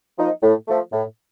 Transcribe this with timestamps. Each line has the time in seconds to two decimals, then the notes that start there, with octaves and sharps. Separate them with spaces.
0.18 F3 A#3 D#4
0.43 A2
0.68 F3 A3
0.92 A2